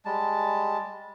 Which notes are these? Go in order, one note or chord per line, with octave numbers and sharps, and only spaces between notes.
G3 G#3 A5